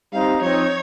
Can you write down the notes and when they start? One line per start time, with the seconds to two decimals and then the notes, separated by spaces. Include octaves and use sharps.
0.13 G3 C4 D#4 F5
0.42 F3 C4 D#4 C#5